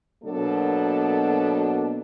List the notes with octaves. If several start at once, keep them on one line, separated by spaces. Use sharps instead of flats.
B2 F#3 A#3 D4 A4